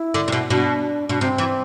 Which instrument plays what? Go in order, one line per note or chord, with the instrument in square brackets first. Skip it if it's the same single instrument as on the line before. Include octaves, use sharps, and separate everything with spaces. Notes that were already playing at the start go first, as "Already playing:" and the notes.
Already playing: [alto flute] E4
[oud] D3
C3
B2
[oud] B2 [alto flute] D4
[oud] B2 [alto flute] D4
[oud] C3 [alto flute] C4
[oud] E3